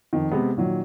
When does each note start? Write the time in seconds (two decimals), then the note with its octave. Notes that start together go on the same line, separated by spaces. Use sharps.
0.13 F2 D#3
0.32 C3 G#3 B3
0.57 A#2 D#3 F#3